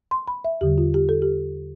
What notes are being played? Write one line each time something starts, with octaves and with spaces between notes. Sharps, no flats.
C6
B5
E5
E2 D3 G3 G4
F4
G4
A4
G4